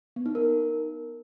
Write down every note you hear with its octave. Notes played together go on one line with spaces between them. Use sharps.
B3
D#4
A#4